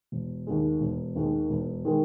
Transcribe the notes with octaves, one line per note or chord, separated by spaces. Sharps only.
E1
D#2 D#3 G#3
E1
D#2 D#3 G#3
E1
D#3 G#3